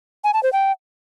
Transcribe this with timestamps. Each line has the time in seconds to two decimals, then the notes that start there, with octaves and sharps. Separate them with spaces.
0.24 G#5
0.34 A5
0.43 C5
0.53 G5